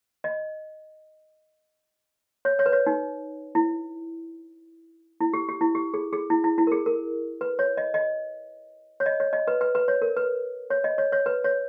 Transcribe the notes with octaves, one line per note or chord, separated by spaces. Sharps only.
D#5
C#5
C#5
B4
C#5
D#4
E4
E4
G4
G4
E4
G4
G#4
G#4
E4
E4
E4
A#4
G#4
A#4
B4
C#5
D#5
D#5
C#5
D#5
C#5
D#5
B4
B4
B4
C#5
A#4
B4
C#5
D#5
C#5
C#5
B4
C#5